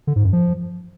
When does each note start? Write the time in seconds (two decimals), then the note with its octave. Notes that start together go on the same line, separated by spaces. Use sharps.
0.07 D3
0.16 G#2
0.24 F#2
0.33 F3